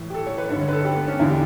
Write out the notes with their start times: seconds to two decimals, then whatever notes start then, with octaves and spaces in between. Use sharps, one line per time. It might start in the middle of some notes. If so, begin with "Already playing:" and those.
Already playing: A2 E3
0.10 G4
0.14 A4
0.26 C#5
0.38 B4
0.49 G2 D3 C#5
0.61 C#5
0.68 B4
0.73 A4
0.84 G4
0.96 B3
1.07 C#4
1.19 E2 D3 E4
1.30 G4